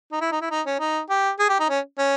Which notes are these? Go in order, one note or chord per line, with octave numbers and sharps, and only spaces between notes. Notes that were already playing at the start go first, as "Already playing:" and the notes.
D#4
E4
D#4
E4
D#4
C#4
D#4
G4
G#4
G4
D#4
C#4
C#4